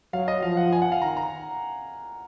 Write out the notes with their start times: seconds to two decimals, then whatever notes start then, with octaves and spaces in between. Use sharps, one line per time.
0.13 F#3 F5
0.28 D#5
0.42 F3 F5
0.57 F#5
0.72 G#5
0.82 F#5
0.92 F5
1.02 D#3 A#5
1.17 A#5